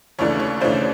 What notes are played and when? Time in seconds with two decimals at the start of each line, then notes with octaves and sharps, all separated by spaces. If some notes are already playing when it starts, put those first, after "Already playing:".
0.19 D#2 C#3 E3 A3 D4 C#5
0.40 C#5
0.61 D#2 C#3 E3 A3 D4 C5